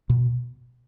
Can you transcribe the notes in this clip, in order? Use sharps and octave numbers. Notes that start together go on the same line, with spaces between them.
B2